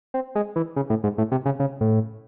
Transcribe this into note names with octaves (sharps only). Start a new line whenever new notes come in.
C4
G#3
E3
C#3
A2
G#2
A2
C3
C#3
C#3
A2